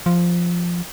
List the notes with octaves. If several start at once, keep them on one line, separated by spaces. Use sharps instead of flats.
F3